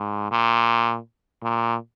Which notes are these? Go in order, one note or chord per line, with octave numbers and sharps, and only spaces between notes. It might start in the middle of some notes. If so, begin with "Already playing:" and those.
Already playing: G#2
A#2
A#2